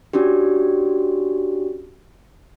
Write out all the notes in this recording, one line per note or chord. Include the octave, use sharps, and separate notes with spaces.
C#4 D4 F#4 G4